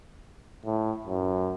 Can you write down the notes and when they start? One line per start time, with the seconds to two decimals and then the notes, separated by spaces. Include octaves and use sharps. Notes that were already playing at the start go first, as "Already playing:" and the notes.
0.66 A2
1.07 F#2